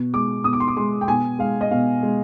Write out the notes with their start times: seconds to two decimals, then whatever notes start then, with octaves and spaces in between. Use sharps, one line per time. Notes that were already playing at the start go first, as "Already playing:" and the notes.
Already playing: B2
0.14 G#3 D6
0.44 B2 D#6
0.53 D6
0.60 C6
0.68 D6
0.77 G#3 C6
1.01 G5
1.08 B2 G#5
1.39 G#3 F5
1.61 D#5
1.71 B2 F5
2.03 G#3